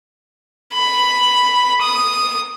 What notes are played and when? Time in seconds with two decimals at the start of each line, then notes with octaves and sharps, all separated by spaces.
0.73 B5
1.82 D#6